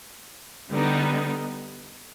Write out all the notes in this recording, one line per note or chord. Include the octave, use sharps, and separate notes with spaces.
D3 G3 B3 D#4